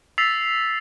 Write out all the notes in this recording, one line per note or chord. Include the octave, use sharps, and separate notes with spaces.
E6 A6 B6 C7 F7